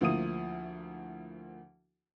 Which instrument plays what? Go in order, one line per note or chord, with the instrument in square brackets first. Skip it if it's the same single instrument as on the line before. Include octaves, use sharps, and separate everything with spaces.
[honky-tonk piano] D2 F3 A#3 E4 D#6 D#7